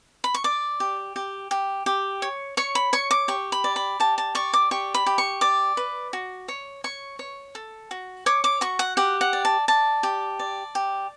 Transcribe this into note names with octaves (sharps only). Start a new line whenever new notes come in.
B5
C#6
D5 D6
G4
G4
G4
G4
C#5
C#5 C#6
B5
C#5 C#6
D6
G4 C#6
B5
D5
B5
G4 A5
A5
D5 C#6
D6
G4 C#6
B5
G4
C#6
D5 D6
B4
F#4
C#5
C#5 C#6
C#5
A4
F#4
C#5 D6
D6
F#4 C#6
F#5
G4 F#5
F#5
D5
A5
D5 A5
G4
D5
G4